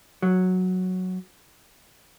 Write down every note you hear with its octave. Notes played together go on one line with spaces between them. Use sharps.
F#3